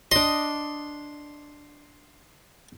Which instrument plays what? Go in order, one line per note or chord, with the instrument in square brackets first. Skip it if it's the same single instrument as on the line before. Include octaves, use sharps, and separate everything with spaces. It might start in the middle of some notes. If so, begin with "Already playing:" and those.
[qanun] D4 D#5 [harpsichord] C6